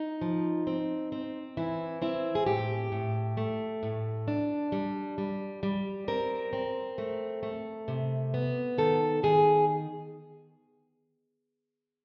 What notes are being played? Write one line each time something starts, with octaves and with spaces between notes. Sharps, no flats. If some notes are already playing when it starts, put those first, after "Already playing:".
Already playing: D#4
F3
C4
C4
E3 E4
C4 E4
G#4
A2 G4
A2
A3
A2
D4
G3
G3
G3
C4 A#4
C4
A3
A3
C3
B3
D#3 A4
D#3 G#4